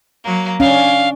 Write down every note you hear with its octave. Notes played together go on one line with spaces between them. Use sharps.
F#3 A#3
C#4 D4 F5